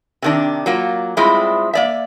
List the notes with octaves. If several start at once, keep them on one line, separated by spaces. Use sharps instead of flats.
C3 D#3 D4
F#3 A#3 F4
A2 G3 G#3 C4 E4 F4
A#3 D5 E5